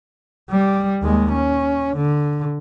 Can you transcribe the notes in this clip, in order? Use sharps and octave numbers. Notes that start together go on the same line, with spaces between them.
G3
D#2 G#3
C#4
D3